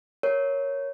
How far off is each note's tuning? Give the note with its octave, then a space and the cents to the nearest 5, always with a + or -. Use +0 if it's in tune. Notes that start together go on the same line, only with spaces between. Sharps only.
A#4 +0 C#5 +0